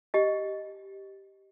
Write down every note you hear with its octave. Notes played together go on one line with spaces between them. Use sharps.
G4 D#5